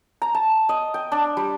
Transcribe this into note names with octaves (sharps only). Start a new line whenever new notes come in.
A#5
A5
D#5
G5
D4
G3